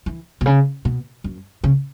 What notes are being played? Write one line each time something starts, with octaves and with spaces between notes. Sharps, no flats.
E3
B2
C#3
B2
F#2
C#3